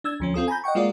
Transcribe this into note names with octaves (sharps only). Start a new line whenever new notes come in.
D4 E6 G#6
D2 F3 C#4
C4 F4 A4 D#6
G#5 A#5 B5 G6
D#5 F#5 G5 C#6
G#3 A#3 F4 F#4 A#4 D5